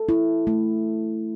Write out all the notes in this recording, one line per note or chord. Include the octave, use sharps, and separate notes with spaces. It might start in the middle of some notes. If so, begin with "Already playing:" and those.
Already playing: A4
E4
A3